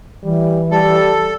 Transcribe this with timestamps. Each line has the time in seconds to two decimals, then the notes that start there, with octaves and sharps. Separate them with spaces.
0.23 E3 G3
0.71 G3 A4